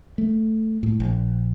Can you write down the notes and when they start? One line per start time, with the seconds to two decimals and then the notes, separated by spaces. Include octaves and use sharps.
0.18 A3
0.83 A2
1.00 A#1